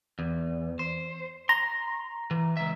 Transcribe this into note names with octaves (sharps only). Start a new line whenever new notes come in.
E2
C5
A#5 C6
E3
C#2 E5